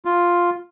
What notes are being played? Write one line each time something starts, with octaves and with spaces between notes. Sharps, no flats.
F4